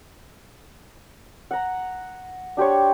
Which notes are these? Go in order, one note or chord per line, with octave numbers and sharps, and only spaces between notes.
F#5 A#5
D4 G4 C5 C#5